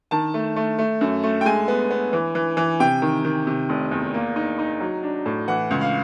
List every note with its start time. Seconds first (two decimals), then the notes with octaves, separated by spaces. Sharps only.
0.11 D#3 A5
0.34 A3
0.56 A3
0.79 A3
1.01 F#2
1.23 A3
1.41 G5
1.45 G#3 G#5
1.68 B3
1.90 B3
2.13 E3
2.35 E3
2.57 E3
2.80 C3 G5
3.02 D#3
3.25 D#3
3.47 C3
3.69 F1
3.91 E2
4.14 A#3
4.36 D#4
4.59 D#4
4.81 F#3
5.03 D4
5.26 A2
5.48 E3 F#5
5.71 C#2
5.81 F5